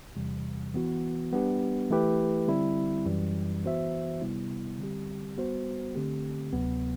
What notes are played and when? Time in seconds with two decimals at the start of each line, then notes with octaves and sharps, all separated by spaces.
0.16 E2 C3 E3 G3
0.74 E3 B3 F#4
1.32 G3 B3 D4 G4 B4
1.90 E3 A3 E4 G4 B4
2.48 D3 G3 C4 E4
3.05 F#2 E3 G3
3.63 E3 B3 F#4 C5 E5
4.21 C3 G3 B3 E4
4.79 D3 G3 C4 G4
5.36 G3 B3 F#4 C5
5.95 D3 A3 C4 G4
6.53 D2 C3 F#3 B3